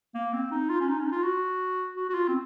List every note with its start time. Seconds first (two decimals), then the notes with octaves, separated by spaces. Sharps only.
0.14 A#3
0.33 C4
0.51 D#4
0.69 F4
0.80 C#4
0.88 D#4
1.00 C#4
1.06 D#4
1.11 F4
1.24 F#4
1.97 F#4
2.09 F#4
2.14 F4
2.28 C4